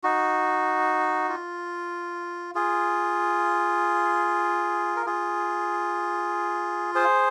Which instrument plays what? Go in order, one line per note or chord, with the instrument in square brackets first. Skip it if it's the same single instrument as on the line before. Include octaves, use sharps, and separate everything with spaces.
[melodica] D#4 F#4
F4
F4 G#4
A#4
F4 G#4
G#4 C5